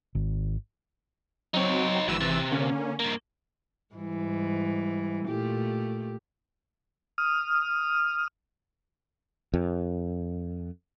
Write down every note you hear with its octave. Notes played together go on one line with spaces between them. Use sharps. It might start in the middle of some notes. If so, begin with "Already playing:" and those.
G#1
F#3 C4 D#4 C#5
G#1 D2 E3 F#3 E6
C3
D3 A#3 C#4
G2 A#3
G#2 E3 G3
A#2 A3 G4
D#6 F6
F2